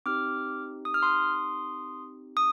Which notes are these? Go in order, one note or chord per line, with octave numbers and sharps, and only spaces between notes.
C4 D#4 G4 D6 F6
D#6
F6
C6 D#6
D#6